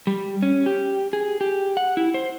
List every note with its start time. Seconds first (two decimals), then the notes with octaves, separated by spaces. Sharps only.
0.07 G3
0.43 C#4
0.66 G4
1.13 G#4
1.41 G4
1.77 F#5
1.97 E4
2.14 C5